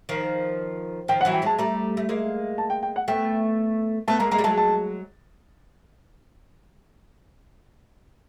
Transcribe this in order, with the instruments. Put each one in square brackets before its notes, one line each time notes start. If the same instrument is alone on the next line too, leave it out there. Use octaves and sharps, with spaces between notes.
[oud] D#3 F3
[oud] D#3 F3 [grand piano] G5
[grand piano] F#5
[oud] E3 F#3
[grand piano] G5
[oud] F#3 G#3 [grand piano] A5
[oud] G3 A3 [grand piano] A#5
[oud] A3
G#3 A#3
[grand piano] A5
G5
G5
F#5
[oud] A3 B3 [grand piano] G5
[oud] A3 B3 [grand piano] A5
[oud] G#3 A#3 [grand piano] A#5
[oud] G#3 A#3 [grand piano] A#5
[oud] G3
[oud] F#3 G#3 [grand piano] A5
[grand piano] A5